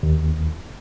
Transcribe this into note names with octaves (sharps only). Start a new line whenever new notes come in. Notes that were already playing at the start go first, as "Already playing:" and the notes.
D#2